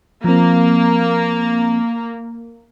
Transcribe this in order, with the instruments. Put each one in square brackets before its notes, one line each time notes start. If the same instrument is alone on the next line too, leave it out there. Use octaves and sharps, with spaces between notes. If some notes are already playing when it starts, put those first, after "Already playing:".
[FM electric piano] F3 C4 [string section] A#3